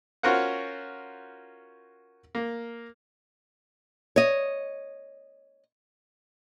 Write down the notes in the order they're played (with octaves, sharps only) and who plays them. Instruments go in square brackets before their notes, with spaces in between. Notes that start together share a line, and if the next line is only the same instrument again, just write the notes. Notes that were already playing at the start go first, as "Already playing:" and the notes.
[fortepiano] C#4 F4 F#4 A#4 C5 F#5
A#3
[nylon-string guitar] C#5 D#5